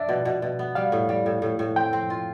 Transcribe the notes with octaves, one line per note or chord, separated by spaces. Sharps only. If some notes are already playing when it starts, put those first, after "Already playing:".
Already playing: D4 E5
B2
B2
B2
B3
G3 F5
A2
G3
A2
A2
A2
C4 G5
C4
F4